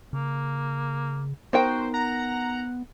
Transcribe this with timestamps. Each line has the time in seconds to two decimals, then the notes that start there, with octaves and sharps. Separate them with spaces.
0.13 C#3 A#3
1.53 B3 D#4 F#4 A#4 C5 G5
1.94 F#5 A#5